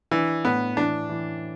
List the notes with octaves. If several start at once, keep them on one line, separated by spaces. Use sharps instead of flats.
E3 D4
A2 B3
E3 D4
E3